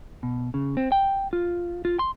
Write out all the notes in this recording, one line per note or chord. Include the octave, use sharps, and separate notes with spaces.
B2
C#3
C4
G5
F4
F4
C6